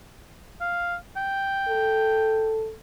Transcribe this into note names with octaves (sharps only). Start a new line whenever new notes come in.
F5
G5
A4